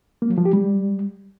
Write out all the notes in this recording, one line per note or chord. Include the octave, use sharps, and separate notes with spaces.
A#3
F#3
F3
G4
G3